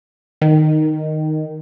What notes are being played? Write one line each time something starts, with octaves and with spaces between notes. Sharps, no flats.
D#3